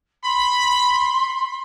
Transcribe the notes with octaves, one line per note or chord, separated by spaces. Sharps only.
B5 C6